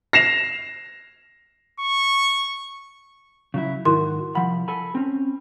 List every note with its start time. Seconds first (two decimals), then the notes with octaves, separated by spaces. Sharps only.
0.13 A#6 C7 E7 F7
1.80 C#6
3.54 C#3 F#3 E4
3.85 G#2 D#3 E4 F#4 A#4 C6
4.35 C2 F3 F#5 B5
4.68 A4 G#5 B5
4.95 C4 C#4